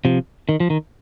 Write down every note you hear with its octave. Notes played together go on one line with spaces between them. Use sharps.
C3 F3
D#3
F3
D#3